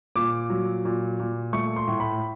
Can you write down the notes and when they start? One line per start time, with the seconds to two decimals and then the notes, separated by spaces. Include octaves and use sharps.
0.16 A#2 D6
0.50 F#3
0.85 A#2
1.20 A#2
1.53 A3 C#6
1.76 C6
1.88 A2
2.00 B5